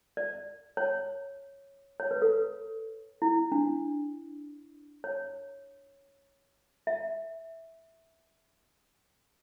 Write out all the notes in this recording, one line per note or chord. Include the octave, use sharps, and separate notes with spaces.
D5
C#5
C#5
B4
A4
B4
E4
D4
C#5
E5